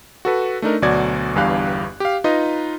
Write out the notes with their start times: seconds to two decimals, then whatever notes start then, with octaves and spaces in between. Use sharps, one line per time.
0.25 F#4 A4 B4
0.62 A3 D4 D#4 A#4
0.82 D2 B2 F#3 F#4 D5 G#6
1.35 G1 E2 G2 G4 F5 F#6
2.00 G4 F5
2.24 D#4 F4 B4 D#5